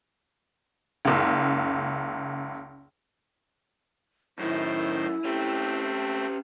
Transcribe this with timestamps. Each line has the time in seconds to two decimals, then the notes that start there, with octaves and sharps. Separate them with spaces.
1.05 F#1 C#2
4.39 F#2 A2 D#3 E4 C5
5.24 A3 C4 C#4 G4